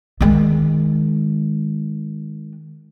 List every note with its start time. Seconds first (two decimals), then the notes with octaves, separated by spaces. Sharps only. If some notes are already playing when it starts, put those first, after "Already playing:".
0.21 D#3 G#3